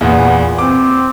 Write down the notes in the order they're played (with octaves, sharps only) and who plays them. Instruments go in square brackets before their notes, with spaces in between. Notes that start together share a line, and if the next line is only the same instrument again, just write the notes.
[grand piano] E2 A#2 [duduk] B3
[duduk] C4 [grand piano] D6